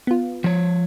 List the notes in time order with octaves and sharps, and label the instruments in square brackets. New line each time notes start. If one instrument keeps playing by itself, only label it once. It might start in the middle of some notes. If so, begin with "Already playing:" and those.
[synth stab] B3 F4
[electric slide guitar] F3 C#5